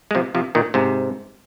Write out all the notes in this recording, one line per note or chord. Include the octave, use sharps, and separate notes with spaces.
G#3
C3 F3
C3 F3
A#2 D#3
G#2 C3